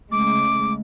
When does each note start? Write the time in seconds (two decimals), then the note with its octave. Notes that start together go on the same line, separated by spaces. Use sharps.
0.12 C#3 G#3 A3 D6